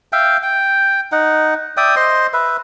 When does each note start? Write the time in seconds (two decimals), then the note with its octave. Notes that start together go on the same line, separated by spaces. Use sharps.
0.13 E5 F5 G5
0.43 G5
1.12 D#4 F#5
1.77 D5 E5 G5 D#6
1.96 C5 D#5 C6
2.33 B4 E5